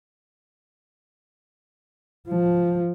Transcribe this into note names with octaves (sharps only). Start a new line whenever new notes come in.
F3